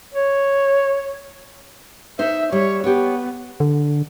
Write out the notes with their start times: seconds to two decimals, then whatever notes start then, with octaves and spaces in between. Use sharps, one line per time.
0.14 C#5
2.19 D#4 C5 E5
2.52 G3 C#5
2.84 B3 G4 C#5
3.60 D3